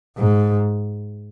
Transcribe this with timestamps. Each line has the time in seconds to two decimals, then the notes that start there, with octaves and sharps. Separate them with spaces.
0.18 G#2